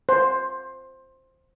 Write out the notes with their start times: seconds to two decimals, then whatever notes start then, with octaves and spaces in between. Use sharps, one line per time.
0.09 C5